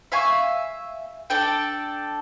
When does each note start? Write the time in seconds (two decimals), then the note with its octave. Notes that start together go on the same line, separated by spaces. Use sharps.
0.12 E5 F5 G#5 C#6
1.30 D4 A4 G5